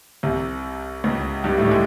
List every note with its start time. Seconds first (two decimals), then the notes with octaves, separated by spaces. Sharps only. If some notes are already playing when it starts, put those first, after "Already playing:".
0.23 C2 C3
1.04 C#2 C#3
1.44 G2 G3
1.58 A2 A3
1.65 G3
1.71 G#3